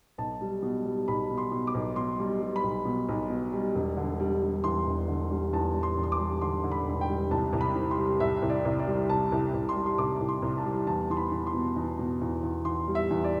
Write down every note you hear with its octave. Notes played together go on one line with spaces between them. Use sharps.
B1 A5
G3
B2
G3
B1 B5
B2
C6
B2
D6
B1
B2 C6
G3
G3
B5
B1
B2
B1
B2
G3
E1
D3
G3
G3
E2 C6
E1
D3
G3
E2 A5
G3
C6
E1
C6
D6
G3
D3 C6
D3
B5
E1
G5
G3
C2 A5
C2
B5
C3
C6
G3
C2 E5
C2
D5
C2
D5
G3
C2 A5
C2
C2
C6
G3
C6
C2 D6
C2
C6
C2
A5
G3
E2 A5
E2 C6
B5
E2
C6
B2
E2
B2
E2
E2
E2 C6
G3
E5
E2
D5